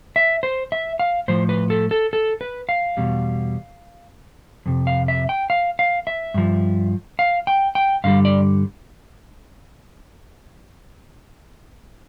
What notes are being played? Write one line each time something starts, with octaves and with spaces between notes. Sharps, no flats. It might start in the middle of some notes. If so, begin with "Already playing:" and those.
E5
C5
E5
F5
A2 F3 C5
B4
A4
A4
A4
B4
F5
E2 B2 G3
F2 C3
F5
E5
G5
F5
F5
E5
G2 F3
F5
G5
G5
G2 D3 G3 F5
D5